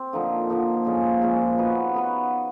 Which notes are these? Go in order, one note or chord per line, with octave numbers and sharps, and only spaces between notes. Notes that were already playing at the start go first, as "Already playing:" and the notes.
Already playing: C4
D3 F3 A#3 D#4
D3 F3 A#3 D#4
A#2 F3 G#3 C#4
A#2 F3 G#3 C#4
B3 D#4 F#4 B4
B3 D#4 F#4 B4